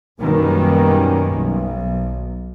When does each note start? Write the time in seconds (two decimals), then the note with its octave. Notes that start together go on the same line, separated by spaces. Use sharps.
0.20 F#2 B2 D#3 G3 A#3 C#4
1.34 B1